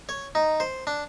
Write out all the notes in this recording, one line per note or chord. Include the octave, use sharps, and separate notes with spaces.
C#5
D#4
C5
D4